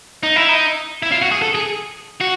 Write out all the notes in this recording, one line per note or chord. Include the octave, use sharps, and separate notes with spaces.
D#4
E4
D#4
E4
F4
F#4
G#4
A4
G#4
F#4